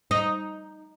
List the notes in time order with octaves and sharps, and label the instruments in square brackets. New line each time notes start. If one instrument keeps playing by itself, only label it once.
[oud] D#4